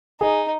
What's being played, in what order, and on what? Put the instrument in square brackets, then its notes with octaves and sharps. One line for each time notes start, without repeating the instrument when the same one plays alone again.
[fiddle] D#4 [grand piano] G#4